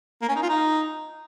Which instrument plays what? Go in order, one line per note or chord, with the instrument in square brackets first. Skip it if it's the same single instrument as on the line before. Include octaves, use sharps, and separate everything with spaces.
[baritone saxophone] A#3
C#4
D#4
F4
D#4